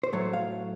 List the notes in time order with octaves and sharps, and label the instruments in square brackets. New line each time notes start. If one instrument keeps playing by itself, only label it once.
[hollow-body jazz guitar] C5
A2 F#3 A3 C#5
F5